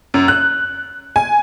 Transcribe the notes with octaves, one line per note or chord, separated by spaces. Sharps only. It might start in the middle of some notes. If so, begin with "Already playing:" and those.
F#2
F#6
G#5